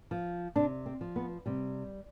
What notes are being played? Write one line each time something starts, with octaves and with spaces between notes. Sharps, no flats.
F3
C3 D4
C4
F3
B3
C3 G3